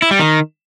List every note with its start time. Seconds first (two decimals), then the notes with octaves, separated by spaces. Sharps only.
0.02 E4
0.11 G3
0.19 D#3